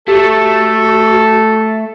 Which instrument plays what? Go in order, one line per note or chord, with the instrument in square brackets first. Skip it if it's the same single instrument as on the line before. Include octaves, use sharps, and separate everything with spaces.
[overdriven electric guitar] A3 [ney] F#4 [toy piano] G4 F5 [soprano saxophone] A4